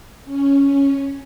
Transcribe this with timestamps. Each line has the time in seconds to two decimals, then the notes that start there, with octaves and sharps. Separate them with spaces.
0.23 C#4